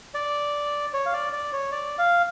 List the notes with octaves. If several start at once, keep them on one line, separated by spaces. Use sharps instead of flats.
D5
C#5
F5
D5
D5
C#5
D5
F5